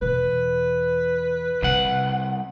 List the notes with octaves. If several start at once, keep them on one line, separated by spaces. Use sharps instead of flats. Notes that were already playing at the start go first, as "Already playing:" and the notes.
E2 B2 B4
C2 C3 F#5